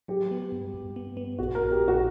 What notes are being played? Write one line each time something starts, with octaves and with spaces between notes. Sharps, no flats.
F#3 G4
B3
G2
G2
B3
B3
A#1 F#4
A#4
A#1
G4
A#1
F#4